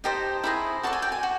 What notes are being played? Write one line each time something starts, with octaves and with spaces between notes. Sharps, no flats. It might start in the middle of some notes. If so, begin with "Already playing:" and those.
D#4 G4 C5 D#5 A5
E4 G#4 C5 D#5
F#4 A4 D5 A5
G#5
G5
G#5
F#4